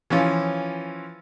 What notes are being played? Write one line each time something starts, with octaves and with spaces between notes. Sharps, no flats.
E3 F3 C#4 F4